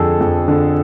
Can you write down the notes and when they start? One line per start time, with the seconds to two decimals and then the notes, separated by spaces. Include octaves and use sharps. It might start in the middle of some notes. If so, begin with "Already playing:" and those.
Already playing: F2 D3 F3 G#4 A4
0.21 F2
0.48 D3